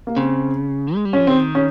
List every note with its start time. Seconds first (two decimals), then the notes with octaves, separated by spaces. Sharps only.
0.07 A#3
0.17 C#3 C4
0.95 G#3
1.05 G3
1.13 F3 C#4
1.27 D#3 C4
1.55 C#4